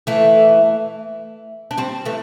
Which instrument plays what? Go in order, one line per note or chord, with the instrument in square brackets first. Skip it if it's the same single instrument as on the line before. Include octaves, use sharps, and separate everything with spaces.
[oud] E3 A3
D4
G3 C4
E3 A3